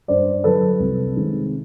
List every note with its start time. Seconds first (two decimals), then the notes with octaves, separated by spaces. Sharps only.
0.08 G2 C5 D5
0.44 D3 F#3 A4 B4
0.80 C2
1.16 C3 D#3 G#3